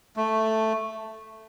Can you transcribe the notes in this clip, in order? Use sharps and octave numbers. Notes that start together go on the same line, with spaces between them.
A3